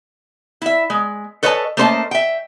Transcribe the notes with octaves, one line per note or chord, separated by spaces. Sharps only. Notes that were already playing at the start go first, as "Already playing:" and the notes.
E4 E5
G#3
A4 B4 C#5 D#5 G#5 A5
A3 A#3 C#4 C5 D#5 A5
E5 G5